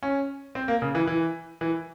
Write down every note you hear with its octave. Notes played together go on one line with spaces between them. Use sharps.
C#4
C4
A#3
C#3
E3
E3
E3